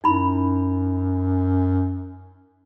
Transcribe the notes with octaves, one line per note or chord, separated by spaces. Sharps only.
F#2 D#4 E4 B5